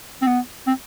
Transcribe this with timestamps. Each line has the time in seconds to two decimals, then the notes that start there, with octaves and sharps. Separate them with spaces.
0.22 C4
0.27 B3
0.67 C4